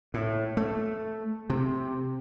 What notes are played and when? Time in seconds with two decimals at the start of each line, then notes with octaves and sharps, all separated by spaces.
0.14 A2
0.57 A3
1.50 C3